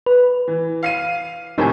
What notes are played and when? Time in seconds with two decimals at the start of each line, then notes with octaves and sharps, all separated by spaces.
0.06 B4
0.48 E3
0.83 F5 C7 D#7
1.58 F2 A2 C3 D#4 A#4 G#5